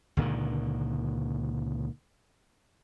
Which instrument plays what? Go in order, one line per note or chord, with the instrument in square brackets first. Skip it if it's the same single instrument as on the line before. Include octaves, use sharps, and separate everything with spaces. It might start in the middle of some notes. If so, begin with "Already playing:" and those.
[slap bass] C#2 A#2 D3 D#3